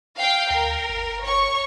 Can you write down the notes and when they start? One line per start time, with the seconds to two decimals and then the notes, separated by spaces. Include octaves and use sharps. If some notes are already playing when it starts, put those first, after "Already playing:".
0.17 F5 G5 C7
0.50 D2 A#4
0.90 G1
1.23 C#5 C#6